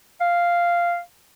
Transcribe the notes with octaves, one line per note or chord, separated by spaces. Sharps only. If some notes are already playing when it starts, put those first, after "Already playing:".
F5